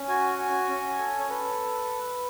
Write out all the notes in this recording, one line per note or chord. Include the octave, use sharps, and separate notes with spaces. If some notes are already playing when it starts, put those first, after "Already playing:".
Already playing: C#4
F#4 G#5
F#4
C#4
A4
C#5
A4 B4